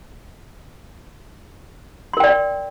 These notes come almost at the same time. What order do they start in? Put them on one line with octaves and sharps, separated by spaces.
C6 A#4 G5 D5